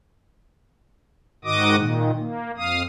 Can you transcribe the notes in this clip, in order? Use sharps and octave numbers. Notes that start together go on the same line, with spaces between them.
G#2 D#3 F#4 D#5 D6 D#6
A#2 D#3
A#3
F2 F5 D#6